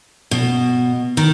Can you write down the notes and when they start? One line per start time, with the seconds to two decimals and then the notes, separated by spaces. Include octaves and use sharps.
0.31 B2
1.17 D#3